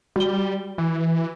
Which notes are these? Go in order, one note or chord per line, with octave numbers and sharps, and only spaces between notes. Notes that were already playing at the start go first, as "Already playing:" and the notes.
G3 F#4 G7
E3